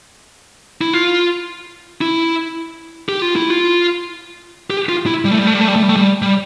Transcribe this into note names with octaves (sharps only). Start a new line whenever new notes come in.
E4
F4
E4
G4
F4
E4
F4
G4
F4
E4
G3
A3
G3
A3
G3
A3
G3
A3
G3
A3
G3
G3